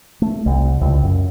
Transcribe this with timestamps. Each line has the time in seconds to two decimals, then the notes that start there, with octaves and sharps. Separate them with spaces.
0.22 A3
0.46 C2
0.81 C#2
1.04 F#2